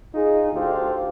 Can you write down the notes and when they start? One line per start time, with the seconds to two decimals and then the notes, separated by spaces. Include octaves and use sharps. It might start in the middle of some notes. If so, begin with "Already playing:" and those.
0.14 D#4 F4 G#4
0.53 D2 F4 G4 A4 C5